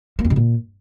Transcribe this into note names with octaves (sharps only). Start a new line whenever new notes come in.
A#3
F2
C3
A#2